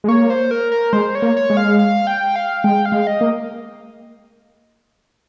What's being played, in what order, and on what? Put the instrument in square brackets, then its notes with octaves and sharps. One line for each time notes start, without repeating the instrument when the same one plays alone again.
[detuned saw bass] G#3
[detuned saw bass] A#3 [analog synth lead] C#5
[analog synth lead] C5
A#4
A#4
[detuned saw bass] G#3 [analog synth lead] C5
[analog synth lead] C#5
[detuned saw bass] A#3
[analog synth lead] C#5
[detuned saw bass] G#3
[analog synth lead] F5
F5
G5
F5
[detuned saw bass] G#3 [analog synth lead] G5
[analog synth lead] F5
[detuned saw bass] G#3
[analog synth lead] D#5
[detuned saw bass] A#3